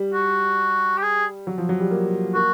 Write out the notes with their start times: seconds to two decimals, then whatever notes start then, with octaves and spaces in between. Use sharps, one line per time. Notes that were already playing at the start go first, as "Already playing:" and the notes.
Already playing: G3
0.14 F#4
0.98 G4
1.02 G#4
1.47 F#3
1.58 F3
1.69 F#3
1.80 G3
1.91 A#3
2.35 A#3 F#4